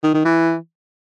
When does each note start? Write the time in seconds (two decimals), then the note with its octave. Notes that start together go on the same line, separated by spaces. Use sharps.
0.04 D#3
0.14 D#3
0.25 E3